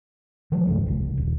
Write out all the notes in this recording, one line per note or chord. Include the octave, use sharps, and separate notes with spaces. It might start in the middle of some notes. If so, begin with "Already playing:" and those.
E3 F3 G3 G#3
C#2 G2 C#3 A3
F#1 C2
D#1